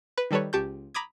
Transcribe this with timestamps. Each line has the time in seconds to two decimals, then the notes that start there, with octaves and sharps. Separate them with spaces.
0.18 B4
0.31 D#3 G3 A4 B4 C#5
0.53 C#2 G4 A5 C#6 G6
0.94 A#5 B5 D6 D#6 G#6